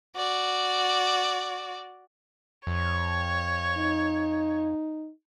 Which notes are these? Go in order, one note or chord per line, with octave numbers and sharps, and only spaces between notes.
F#4 D5
F2 C#5
D#4